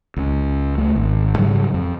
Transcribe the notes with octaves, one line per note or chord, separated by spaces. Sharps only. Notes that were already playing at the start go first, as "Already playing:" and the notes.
C#2 C#3
C#2 A3
G#1
G#2 C#3 F#3 G3
F2